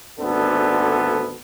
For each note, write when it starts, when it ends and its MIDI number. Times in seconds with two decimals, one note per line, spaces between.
0.19 1.37 32
0.19 1.37 38
0.19 1.37 50
0.19 1.37 59
0.19 1.37 69